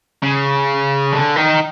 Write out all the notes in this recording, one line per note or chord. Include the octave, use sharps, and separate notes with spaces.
C#3
D3
D#3